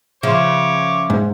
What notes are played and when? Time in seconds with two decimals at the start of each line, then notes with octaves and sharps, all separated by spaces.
0.23 C#3 F3 C#5 E5 C6 D6
1.10 G#2